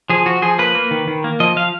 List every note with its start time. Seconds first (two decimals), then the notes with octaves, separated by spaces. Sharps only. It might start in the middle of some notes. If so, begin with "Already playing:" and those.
0.10 F3 G#4
0.26 F3 F#4
0.42 F3 G#4
0.58 A#3 B4
0.75 A#3
0.91 D#3
1.08 D#3
1.24 A#3
1.40 F3 D#5
1.56 F3 F5